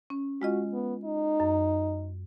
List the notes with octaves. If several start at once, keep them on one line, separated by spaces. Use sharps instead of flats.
C#4
G#3 F4 F#4 D#5
B3
D#4
F#2